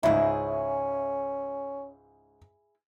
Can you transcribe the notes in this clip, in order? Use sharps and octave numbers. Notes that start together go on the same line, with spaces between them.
C#2 G#2 C#4 D#4 E4 G#4 E5 B5